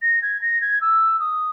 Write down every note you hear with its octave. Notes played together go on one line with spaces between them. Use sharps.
A#6
G#6
A#6
G#6
E6
D#6